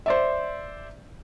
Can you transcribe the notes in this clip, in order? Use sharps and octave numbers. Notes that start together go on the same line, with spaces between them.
C5 D5 E5